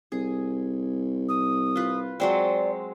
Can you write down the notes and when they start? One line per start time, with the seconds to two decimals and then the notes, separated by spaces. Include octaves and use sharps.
0.12 C2 G#4
1.28 D#6
1.76 F4 B4
2.20 F#3 G#3 C4 D5